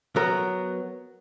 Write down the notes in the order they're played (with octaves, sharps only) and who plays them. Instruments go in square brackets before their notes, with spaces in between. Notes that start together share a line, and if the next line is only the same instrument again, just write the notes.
[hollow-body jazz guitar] F#3 B3 A#4